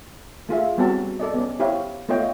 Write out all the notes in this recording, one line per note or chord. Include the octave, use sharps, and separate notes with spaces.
A3 F4 G#4 E5
G3 B3 C4 E4 F#4 A5
A4 D5 D#5
B3 C#4
E4 G4 C5 C#5 F5
A3 B3 F4 C#5 D#5 G5